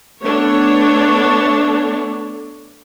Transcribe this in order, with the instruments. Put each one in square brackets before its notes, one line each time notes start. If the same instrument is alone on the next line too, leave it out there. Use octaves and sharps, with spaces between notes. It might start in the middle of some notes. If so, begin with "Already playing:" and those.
[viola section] A3 B3 D4 C#5